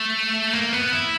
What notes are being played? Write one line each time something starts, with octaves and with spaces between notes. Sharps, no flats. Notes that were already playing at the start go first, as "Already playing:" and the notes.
Already playing: A3
A#3
B3
E4